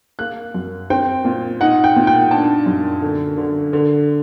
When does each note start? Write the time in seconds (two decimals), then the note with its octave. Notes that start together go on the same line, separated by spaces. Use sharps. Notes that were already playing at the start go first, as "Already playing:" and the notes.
0.19 A#3 F#6
0.54 F#2
0.90 C4 G5
1.25 A#2
1.61 D#4 F#5
1.84 G5
1.96 A#2
2.07 G5
2.31 D4 A5
2.66 F#2
3.02 D3
3.38 D3
3.73 D3